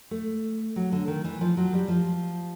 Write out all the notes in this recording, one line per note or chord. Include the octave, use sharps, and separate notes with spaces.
A3
F#3
D3
D#3
E3
F3
F#3
G3
F3